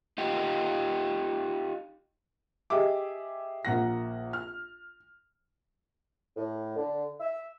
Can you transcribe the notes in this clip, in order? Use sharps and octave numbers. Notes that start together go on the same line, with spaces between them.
D#4 F4 G4
G4 G#4 D#5 E5 D6
A#1 A#3 F#5 A#6
F6
A2
D3
E5